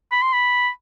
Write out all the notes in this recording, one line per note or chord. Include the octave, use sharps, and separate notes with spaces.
B5
C6
B5